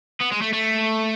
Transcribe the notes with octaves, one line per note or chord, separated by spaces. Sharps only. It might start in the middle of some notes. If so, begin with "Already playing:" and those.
B3
G#3
A3
A3